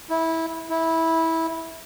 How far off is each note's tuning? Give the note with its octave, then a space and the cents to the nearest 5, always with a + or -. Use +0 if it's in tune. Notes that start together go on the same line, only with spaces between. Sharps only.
E4 -15
E4 -15